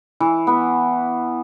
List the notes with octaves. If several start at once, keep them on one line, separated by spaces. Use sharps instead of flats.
E3
B3 B4